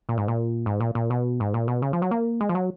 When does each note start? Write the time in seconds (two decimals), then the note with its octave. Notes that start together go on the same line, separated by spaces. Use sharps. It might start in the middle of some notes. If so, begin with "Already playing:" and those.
0.09 A#2
0.18 G#2
0.28 A#2
0.66 G#2
0.80 A#2
0.95 A#2
1.10 B2
1.40 G#2
1.54 A#2
1.68 B2
1.82 C#3
1.93 F3
2.02 F#3
2.11 A#3
2.41 G#3
2.49 F3
2.55 F#3